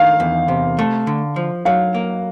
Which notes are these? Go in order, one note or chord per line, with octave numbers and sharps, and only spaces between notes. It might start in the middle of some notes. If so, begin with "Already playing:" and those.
Already playing: D#3 F5
E2
C3
A3
D3
F3
F#3 F5
A#3